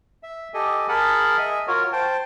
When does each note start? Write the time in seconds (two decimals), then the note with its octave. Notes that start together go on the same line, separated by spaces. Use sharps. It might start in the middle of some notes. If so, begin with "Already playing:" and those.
0.23 E5
0.54 G4 A4 D#5 G#5
0.89 G#4 A#4 F#5 A5 B5
1.38 D#5 E5 G#5
1.67 F4 F#4 A#4 C#5
1.92 C5 G5 A5